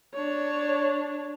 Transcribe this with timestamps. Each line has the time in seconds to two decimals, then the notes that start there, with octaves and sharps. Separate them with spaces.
0.14 D4 C#5